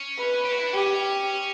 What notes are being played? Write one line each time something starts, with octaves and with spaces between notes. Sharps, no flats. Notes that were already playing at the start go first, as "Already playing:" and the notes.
Already playing: C#4
B4
G4
F#4
E4
D4
C#4 G4